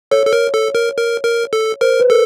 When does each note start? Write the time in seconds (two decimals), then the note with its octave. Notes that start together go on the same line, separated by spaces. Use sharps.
0.11 A4 C#5
0.26 A4
0.33 A#4
0.54 A4
0.75 A#4
0.97 A#4
1.24 A#4
1.53 A4
1.81 A#4 C5
2.00 B4
2.09 A4 A#4